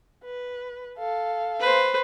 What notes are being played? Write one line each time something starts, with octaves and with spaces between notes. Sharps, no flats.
B4
A4 F5
B4 C5